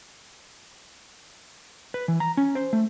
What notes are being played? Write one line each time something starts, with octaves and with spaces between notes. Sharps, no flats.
B4
E3
A#5
C#4
C5
A3